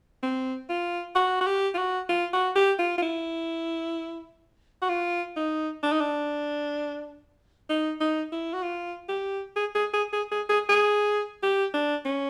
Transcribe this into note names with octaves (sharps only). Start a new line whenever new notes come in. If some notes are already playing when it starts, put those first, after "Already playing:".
C4
F4
F#4
F#4
G4
F4
F#4
F4
F#4
G4
F4
F4
E4
F#4
F4
D#4
D4
D#4
D4
D#4
D#4
E4
F#4
F4
G4
G#4
G#4
G#4
G#4
G#4
G#4
G#4
G4
D4
C#4